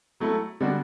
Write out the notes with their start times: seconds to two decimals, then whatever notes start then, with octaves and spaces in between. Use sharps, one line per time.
0.20 F#3 A3 E4 A4
0.61 D3 G3 B3 D4 F#4